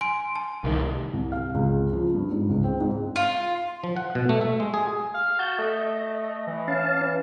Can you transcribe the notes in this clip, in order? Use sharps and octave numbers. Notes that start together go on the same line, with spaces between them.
G#5 C6 D7
A5
C2 D#3
C2
F5
C#2
F3
G2
G#2
C#2
C4
G#2
F4
F3
F#5
B2
A3
E5
G#3
G#4
F5
F#4 A5 G6
A3 D#5
E3
C#4 F5 A5